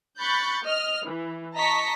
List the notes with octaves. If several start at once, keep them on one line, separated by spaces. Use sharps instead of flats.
B5 C#6 F#6 G6 A6
D#5 F6
E3
D#5 A5 A#5 C#6 B6